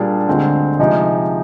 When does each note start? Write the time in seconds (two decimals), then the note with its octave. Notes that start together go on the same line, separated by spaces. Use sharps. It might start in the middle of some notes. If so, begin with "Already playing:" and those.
Already playing: A#2 G3 D4 G#4
0.27 D2 D3 G#3 C4
0.79 C3 F3 G#3 D#4 G4